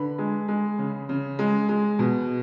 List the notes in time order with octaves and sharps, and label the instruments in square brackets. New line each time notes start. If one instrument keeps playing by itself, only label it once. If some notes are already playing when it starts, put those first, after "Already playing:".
Already playing: [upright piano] D3 B4 B5
G#3
G#3
C#3
C#3
G#3
G#3
B2